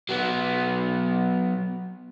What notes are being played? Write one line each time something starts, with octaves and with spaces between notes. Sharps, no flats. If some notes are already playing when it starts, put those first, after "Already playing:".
F#3 B3